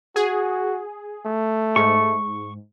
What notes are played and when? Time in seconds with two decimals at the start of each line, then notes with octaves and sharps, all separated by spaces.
0.16 F#4 G#4
1.26 A3
1.76 G#2 C#6